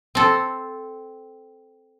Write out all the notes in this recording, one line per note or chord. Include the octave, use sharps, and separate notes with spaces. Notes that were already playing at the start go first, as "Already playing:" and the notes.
C4 A4